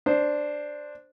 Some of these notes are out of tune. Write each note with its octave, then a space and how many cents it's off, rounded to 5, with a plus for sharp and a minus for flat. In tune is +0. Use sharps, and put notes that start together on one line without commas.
D4 +0 C5 +0